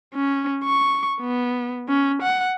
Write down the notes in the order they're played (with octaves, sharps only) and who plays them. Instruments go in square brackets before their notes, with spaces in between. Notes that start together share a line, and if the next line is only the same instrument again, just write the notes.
[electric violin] C#4
C#6
B3
C#4
F#5